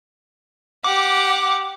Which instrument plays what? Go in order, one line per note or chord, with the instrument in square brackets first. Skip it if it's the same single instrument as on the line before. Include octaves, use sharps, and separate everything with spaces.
[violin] G4 F#5 [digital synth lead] D6